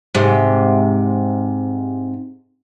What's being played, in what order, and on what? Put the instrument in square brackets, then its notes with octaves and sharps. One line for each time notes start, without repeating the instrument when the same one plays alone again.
[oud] G#2 C3